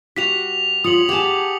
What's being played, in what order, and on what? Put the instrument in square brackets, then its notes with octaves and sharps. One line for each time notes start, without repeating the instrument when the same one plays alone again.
[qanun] G3 F#4 [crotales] B6 F7
[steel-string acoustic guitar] F4 C#5 [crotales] D#6 C#7 F#7
[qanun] G4 G#4 A5 [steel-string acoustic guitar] F#5 G#5